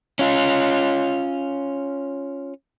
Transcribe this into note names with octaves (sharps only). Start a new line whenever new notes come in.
C#4 F4